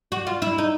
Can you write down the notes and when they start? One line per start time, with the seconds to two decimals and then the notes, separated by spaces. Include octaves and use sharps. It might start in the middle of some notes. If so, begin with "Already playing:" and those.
0.12 F#4
0.27 F4
0.42 E4
0.58 D#4